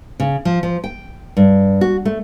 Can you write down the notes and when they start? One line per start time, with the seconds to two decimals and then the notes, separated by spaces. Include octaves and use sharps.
0.20 C#3
0.45 F3
0.63 F3
0.84 G5
1.37 G2
1.81 F#4
2.05 A3